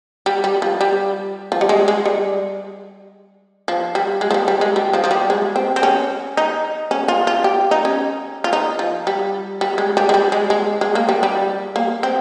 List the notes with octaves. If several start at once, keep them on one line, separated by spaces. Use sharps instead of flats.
G3
G3
F3
G3
F3
G3
G#3
G#3
G3
F3
G3
G#3
F3
G3
G3
G#3
G3
F3
F3
G3
G#3
C4
C4
C#4
D#4
C#4
F4
F4
G4
D#4
C#4
F4
D#4
F3
G3
G3
G#3
G3
G#3
G3
G#3
G#3
G#3
A#3
G3
G3
A#3
C4